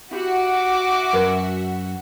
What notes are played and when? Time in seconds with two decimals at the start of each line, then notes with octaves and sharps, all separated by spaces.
0.11 E4 F#4 G4 E5 D6
1.13 F#2 A#4 B4